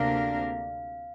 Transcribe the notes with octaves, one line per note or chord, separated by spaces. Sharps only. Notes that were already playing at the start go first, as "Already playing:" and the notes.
Already playing: D2 C3 A#3 D4 A#4 F5